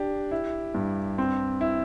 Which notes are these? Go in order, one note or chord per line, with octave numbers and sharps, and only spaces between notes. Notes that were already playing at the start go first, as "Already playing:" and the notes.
Already playing: D4 G4
E4
G2
C4
E4